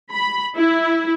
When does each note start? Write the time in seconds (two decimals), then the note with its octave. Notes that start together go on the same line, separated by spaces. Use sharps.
0.12 B5
0.55 E4